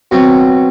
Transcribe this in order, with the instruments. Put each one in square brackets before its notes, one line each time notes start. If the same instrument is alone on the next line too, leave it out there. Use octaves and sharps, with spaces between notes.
[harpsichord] B2 F#3 C4